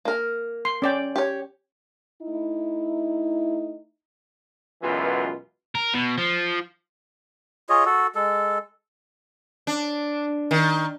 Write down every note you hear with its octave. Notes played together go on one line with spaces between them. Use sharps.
A#3 A#4
C6
C#4 D5 G5
G4 C#5
A3 D#4 E4
C#2 F#2 B2 E3 F4 B4
A#4
B2
F3
F4 G#4 C#5 D#5
F#4 A4
G#3 A4
D4
D#3